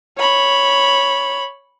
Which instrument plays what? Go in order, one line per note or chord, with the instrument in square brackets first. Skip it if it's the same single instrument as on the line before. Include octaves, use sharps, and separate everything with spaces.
[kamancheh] C#5 B5